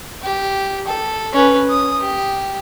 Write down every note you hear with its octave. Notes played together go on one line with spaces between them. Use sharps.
G4
A4
C#4 B4
D#6
G4